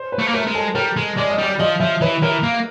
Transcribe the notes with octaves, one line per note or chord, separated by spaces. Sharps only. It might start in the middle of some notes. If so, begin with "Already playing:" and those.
Already playing: C5
B4
A3
A#3
A3 A#4
G#3
A4
G3 A#4
G#3
G#3 D5
D#5
G3 D5
F3 D#5
F3 E5
E3 B4
E3 A#4
A#3